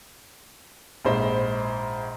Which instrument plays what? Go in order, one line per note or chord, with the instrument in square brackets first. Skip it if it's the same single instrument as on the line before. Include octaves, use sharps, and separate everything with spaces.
[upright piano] A#1 G#2 C5 B5